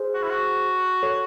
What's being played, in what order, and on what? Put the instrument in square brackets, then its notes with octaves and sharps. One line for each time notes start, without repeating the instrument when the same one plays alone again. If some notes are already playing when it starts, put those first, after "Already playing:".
Already playing: [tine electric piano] G#4 C5
[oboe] F#4
E4
F#4
[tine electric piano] A4 C#5